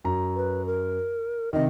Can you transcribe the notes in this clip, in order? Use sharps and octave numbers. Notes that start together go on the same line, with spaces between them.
F#2 A#5
B4
A#4
C3 D#3 D#5